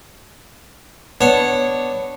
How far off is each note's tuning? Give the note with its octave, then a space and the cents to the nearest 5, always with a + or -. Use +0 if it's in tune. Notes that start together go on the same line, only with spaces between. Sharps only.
B3 +0 D4 +0 C#5 -10